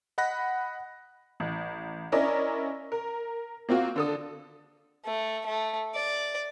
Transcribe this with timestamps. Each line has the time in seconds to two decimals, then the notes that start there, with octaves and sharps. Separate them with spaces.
0.18 D#5 F#5 B5 F#6 A#6
1.40 A1
2.12 C#4 D4 E4 A#4 D5 D#5
2.92 A#4
3.69 A#3 C4 F4 F#4
3.96 D3 A4 D#6
5.05 A3
5.46 A3
5.95 D5